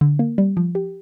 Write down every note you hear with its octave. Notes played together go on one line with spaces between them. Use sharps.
D3
A#3
G3
F3
G4